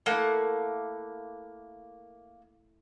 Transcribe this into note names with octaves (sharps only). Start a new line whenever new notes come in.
A3 A#3 E4 F#5